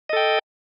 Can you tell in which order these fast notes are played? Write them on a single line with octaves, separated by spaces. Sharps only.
D#5 A4 G5